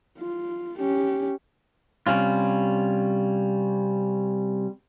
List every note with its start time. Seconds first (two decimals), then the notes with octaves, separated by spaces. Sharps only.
0.19 F4
0.79 C#4 G4
2.07 C3 G3 C#4 F4